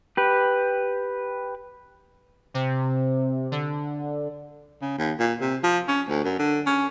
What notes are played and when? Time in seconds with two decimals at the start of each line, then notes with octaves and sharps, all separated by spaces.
0.17 G4 B4
2.54 C3
3.52 D3
4.82 C#3
4.98 D#2
5.19 A#2
5.41 C3
5.63 F3
5.88 C#4
6.08 D2
6.24 F#2
6.39 D3
6.66 C#4